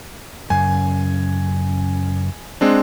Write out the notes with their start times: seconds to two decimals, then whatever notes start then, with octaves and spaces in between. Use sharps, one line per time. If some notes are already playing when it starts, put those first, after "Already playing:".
0.50 F#2 C#3 G#5
2.61 G#3 C4 D4